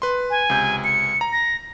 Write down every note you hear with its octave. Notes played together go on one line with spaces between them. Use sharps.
B4 C6
G#5
C#2 C3 G6
C#7
A#5
A#6